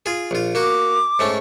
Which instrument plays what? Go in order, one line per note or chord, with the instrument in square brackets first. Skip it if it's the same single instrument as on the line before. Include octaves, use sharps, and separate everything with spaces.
[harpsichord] F4 G#4
A#1 F4
[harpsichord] A#3 F#4 [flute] D6
[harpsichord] G#2 A3 C#4